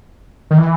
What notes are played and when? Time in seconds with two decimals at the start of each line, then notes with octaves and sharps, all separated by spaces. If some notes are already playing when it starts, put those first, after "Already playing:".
0.51 D#3
0.58 E3